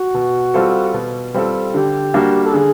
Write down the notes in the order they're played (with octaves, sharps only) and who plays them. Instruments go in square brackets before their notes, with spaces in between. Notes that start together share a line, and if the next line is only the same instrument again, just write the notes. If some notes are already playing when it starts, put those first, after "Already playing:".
Already playing: [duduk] F#4
[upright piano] B2
G3 C4 F4 A4
B2
G3 C4 F4 A4
[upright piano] D3 [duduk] G4
[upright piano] G3 A#3 D4 F#4
[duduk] A4
[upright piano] D3 [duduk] G#4